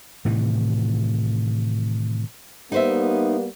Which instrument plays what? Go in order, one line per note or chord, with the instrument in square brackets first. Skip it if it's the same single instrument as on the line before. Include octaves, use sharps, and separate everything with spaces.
[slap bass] A2 C3 D#3 E3
[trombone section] G3 A#3 B3 [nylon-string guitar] D#4 C5 E5